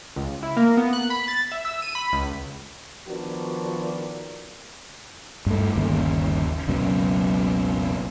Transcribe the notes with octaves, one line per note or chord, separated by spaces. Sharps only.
C#2
E4
A#3
B3
F#6
B5
A6
E5
E6
D#7
B5
C#2
D#3 F3 B3 D4 F#4 A#4
G2 A3
G1 D#2 C#3
F#1 C#2 F#2 B2